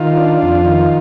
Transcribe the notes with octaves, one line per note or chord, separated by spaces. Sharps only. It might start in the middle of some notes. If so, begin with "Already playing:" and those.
Already playing: D#3 F4
D4
F2
D#3